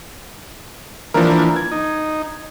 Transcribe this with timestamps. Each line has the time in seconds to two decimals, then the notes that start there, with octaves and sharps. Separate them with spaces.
1.14 E3 F3 A#3 D4 A#4
1.56 G#6
1.71 D#4